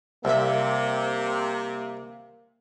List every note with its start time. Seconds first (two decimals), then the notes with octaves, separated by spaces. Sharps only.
0.25 C2 C3 A#3 E5